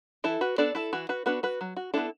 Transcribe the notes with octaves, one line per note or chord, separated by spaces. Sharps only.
E3 E4 A4
F#4 B4
B3 D4 A4 D5
E4 A4
E3 F#4
F#4 B4
B3 D4 F#4 B4
F#4 B4
F#3
F#4
B3 D4 E4 A4